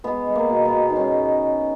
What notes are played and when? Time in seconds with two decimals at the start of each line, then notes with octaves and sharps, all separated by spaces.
0.04 G#3 B3
0.27 G#3
0.35 A#3
0.50 B2
0.65 B3
0.73 B2
0.90 D#4
0.96 G#3 C#4